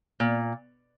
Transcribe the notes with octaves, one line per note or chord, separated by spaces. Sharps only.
A#2